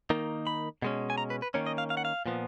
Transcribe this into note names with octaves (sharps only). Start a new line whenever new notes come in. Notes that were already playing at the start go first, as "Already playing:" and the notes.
D#3 A#3 D#4
B5
B2 G#3 C#4
G#5
A#5
B4
B4
D#3 A#3 C#4 C#5
D#5
F5
F5
F#5
F5
A#2 F3 B3